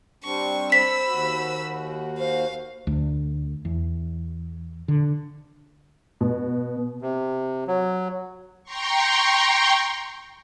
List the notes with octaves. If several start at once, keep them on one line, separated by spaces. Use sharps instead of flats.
G3 C4 D4 C#6
C5 B5 E6 B6
D#2 F#4
C5 F5
D2
E2
D3
B2
C3
F#3
G5 A#5 C6 C#6